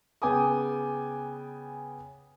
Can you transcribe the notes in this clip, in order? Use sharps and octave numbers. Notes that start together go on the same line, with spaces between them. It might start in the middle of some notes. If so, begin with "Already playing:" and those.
C#3 B3 G5 G#5 D6 D#6